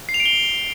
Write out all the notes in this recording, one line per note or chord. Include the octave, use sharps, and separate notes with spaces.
C7
F7
D7
G7